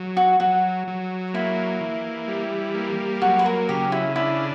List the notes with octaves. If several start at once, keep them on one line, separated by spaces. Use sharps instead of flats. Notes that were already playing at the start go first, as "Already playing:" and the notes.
Already playing: F#3
F#4
F#3 F#4
F#3
A#3 E4
E3
G3
A#3
F#3 F#4
B4
A#4
C#3 G4
E4
D4 E4